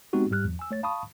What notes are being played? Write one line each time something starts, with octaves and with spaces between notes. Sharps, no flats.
G#3 B3 C4 D#4 F#4 G4
G#2 G3 G4 F6 F#6
E2 F3
G#5 E6
A3 C#5 A6
F5 A5 B5 C#6 D#6